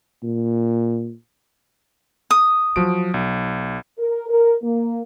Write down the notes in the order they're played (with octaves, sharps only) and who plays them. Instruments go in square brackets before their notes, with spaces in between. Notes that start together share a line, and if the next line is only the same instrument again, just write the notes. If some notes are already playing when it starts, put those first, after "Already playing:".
[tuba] A#2
[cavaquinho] D#6
[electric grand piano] F3 F#4 D7 [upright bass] F#3
[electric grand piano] B1
[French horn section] A#4
A#4
A#3